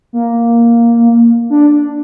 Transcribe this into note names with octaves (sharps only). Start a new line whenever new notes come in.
A#3
D4